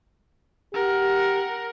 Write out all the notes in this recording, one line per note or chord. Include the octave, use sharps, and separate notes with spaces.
G4 A#4 F#5